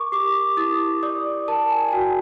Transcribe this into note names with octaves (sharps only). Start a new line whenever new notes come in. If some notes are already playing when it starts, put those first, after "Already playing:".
Already playing: A#4 C#6 D6
G4 D6
E4 D#6
D5 D#6
A#4 A5
G#5
G5
F#4 G#5